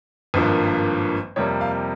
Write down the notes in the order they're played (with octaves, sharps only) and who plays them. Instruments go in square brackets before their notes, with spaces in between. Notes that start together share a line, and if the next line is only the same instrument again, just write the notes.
[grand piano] G#1 G2 F3 A#3
F2 C3 G3 A#3 C#5
F5